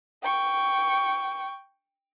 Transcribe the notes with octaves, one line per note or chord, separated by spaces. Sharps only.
G5 C#6